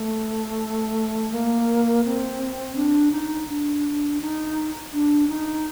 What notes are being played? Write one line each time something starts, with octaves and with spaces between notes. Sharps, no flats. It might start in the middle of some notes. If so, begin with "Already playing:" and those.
Already playing: A3
A#3
C4
D4
D#4
D4
D#4
D4
D#4